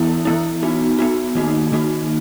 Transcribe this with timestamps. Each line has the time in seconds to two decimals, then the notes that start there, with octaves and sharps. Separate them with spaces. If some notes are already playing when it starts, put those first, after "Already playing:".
Already playing: E3 B3 E4
0.25 E3 B3 E4
0.63 B3 D#4 F#4
0.99 B3 D#4 F#4
1.35 D#3 A#3 D#4 F#4
1.72 D#3 A#3 D#4 F#4